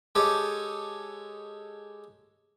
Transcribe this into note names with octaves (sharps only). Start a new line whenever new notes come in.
G#3 G4 A4 C#5 D#5 D6